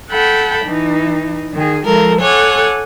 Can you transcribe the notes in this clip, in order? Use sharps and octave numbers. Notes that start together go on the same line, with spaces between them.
A4 F#5 G5 A5 B5
E3 D#4
D#3 G#4
F3 G#3 A4 A#4
A4 C#5 F#5 G#5 D6